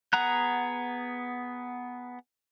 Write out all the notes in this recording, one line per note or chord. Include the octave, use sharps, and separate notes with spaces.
B3 G#4 F#5 A#5 F#6